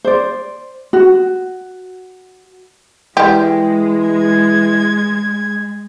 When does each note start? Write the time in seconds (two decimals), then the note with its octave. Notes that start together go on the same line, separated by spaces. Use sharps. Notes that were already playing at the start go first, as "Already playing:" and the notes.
0.05 C5 D5
0.93 F#4
3.17 E3 G3 G#3 G4
4.07 G#6